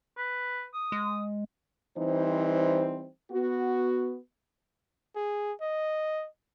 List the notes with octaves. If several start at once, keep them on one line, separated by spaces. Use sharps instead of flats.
B4
D#6
G#3
E3 G3 C4 D#4 C5
B3 F#4
G#4
D#5